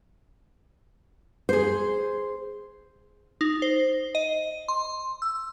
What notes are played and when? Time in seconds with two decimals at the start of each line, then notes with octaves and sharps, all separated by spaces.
1.49 G#4 C5
3.41 D#4
3.62 C5
4.15 D#5
4.68 C6
5.22 E6